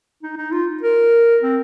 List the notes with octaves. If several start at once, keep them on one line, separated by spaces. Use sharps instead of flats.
D#4
D#4
F4
A#4
C4